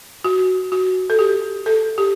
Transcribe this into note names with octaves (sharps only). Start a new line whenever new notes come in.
F#4
F#4
A4
G4
A4
G4